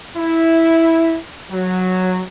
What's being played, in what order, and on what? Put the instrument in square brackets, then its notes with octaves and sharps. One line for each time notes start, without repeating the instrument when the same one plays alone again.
[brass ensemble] E4
F#3